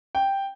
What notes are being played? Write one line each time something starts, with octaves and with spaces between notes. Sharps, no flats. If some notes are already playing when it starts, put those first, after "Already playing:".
G5